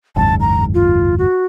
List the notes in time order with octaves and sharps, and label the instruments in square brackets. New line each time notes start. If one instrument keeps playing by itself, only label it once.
[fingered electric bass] F#1 D#2 G#2 [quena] A5
[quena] A#5
F4
F#4